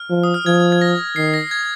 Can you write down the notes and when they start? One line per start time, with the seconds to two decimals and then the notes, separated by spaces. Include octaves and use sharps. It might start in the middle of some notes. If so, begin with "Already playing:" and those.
Already playing: F6
0.10 F3
0.23 D#6
0.34 F6
0.46 F3 G#6
0.72 G#6
0.81 A#6
1.16 D#3 C7
1.34 A#6
1.51 G#6